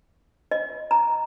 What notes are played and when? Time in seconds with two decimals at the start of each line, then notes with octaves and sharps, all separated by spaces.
0.51 D#5
0.91 A#5